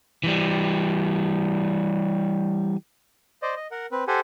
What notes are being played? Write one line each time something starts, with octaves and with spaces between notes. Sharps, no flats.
E3 G3
C5 D5 D#5
D#5
A#4 F#5
C4 B4
G4 A4 C5 F#5 G#5